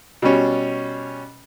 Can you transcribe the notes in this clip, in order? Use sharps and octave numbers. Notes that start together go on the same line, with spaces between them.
B2 G3 C#4